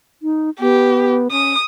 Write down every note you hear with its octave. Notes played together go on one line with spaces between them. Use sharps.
D#4
B3 G4
C#4 D#6